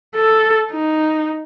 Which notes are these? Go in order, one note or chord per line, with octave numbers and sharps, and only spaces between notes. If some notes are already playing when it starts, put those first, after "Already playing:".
A4
D#4